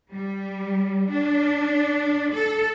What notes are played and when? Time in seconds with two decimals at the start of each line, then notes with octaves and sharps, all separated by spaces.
0.11 G3
1.12 D4
2.35 A4